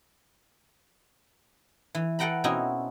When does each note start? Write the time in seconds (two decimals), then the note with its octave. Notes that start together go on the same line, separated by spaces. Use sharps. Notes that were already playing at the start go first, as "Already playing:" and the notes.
1.95 E3
2.19 A4 B4 F#5 G5 A#5 B5
2.44 B2 C4 C#4 D#4 E4 F#4